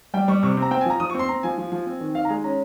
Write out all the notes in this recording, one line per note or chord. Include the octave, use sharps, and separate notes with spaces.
G3 G5
G3 C#6
C3 C#6
C4
A#5
C4 G5
G#5
F3 A#5
F3 D#6
C#6
C4 C6
C4 A#5
F3 G#5
F3
F3
C4
D#3
D#3 F5
A#5
G#3 G#5
C#4 A#5